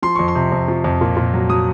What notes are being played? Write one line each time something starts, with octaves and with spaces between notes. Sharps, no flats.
F3 C6
F2 C#6
C6
C3
F2
F3
F2
A#2
A#2
F#3
F#3 D#6